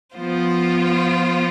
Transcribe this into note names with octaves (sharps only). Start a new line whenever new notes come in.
F3 B3 F4 C5